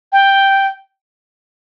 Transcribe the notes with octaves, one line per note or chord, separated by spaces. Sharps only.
G5